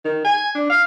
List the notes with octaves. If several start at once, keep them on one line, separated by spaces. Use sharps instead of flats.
D#3
G#5
D4
F5